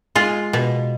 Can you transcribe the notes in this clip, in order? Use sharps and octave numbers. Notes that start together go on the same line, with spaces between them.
G#3 F4
B2